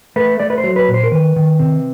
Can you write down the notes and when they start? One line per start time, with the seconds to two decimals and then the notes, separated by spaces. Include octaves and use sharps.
0.16 A3 B4
0.40 A3 D5
0.50 B4
0.58 C5
0.64 F#3
0.76 B4
0.88 A#2
0.94 C5
1.04 A#4
1.11 D#3 B4
1.36 D#3
1.59 C3